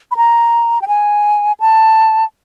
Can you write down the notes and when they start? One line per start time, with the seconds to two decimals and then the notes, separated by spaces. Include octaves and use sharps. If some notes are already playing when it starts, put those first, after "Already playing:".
0.11 B5
0.17 A#5
0.82 G5
0.88 G#5
1.60 A5